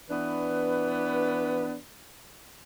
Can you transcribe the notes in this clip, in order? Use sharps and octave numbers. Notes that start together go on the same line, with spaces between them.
E3 B3 D4 B4